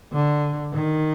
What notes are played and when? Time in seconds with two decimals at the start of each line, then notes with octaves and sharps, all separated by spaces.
0.13 D3
0.74 D#3